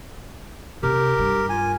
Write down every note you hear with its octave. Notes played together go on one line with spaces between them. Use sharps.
C3 D4 G4 A#4
G2
F4 G#5